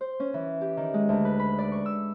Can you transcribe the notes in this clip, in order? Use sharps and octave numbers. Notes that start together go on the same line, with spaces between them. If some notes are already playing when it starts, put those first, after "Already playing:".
C5
C#4
E3
G4
D#3
G#3
D2
B4
B5
D5
C#6
E6